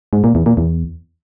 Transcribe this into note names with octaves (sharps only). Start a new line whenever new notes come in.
G#2
A#2
E2
A#2
E2